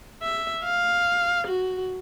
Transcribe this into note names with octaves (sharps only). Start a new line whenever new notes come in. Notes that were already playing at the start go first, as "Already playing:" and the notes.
E5
F5
F#4